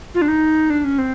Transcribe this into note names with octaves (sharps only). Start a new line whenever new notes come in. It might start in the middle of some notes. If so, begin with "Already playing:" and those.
F4
D4
D#4
D4
C#4
C4